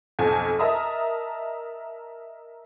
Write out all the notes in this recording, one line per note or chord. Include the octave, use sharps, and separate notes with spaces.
B1 F2 G#5 A5
A#4 D#5 E5 A5 A#5 D#6